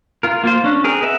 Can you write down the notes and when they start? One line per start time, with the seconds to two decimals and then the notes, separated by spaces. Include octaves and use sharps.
0.23 F4 A#4
0.44 A#3 F4 C5
0.64 C#4 D4
0.84 C4 G#4 A#4
1.02 B4 D#5 E5 F#5